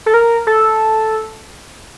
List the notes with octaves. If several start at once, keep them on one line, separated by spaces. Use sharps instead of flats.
A4
A#4
A4